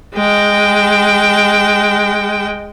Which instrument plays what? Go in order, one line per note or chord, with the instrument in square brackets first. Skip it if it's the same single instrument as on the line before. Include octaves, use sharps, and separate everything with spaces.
[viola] G#3 G5